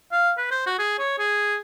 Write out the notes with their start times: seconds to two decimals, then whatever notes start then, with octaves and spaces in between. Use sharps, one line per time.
0.12 F5
0.38 B4
0.51 C5
0.67 F#4
0.79 G#4
0.99 C#5
1.19 G#4